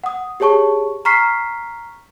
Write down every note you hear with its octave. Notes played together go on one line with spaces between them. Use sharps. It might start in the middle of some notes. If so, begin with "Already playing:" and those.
F#5 D#6
G4 G#4 C#5 A5 C#6
A#5 C#6 F6 B6 C7